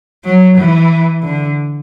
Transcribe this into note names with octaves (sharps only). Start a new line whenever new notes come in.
F#3
E3
D3